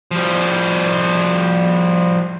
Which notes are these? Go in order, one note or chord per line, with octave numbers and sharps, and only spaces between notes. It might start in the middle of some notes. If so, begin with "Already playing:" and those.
F3 G3